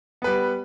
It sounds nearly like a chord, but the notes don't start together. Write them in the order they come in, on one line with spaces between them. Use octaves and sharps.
B3 B4 G3